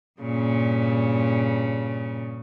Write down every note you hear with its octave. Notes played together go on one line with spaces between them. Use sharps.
G2 A#2 C#3